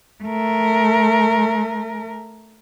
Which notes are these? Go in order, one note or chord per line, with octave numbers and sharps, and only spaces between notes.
A3 A#4